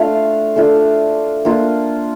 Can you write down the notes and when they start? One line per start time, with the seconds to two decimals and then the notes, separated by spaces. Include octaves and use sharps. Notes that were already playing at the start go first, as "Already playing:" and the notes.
Already playing: A3 D4 F4 F5
0.56 A3 D4 F4
1.45 A#3 D4 F4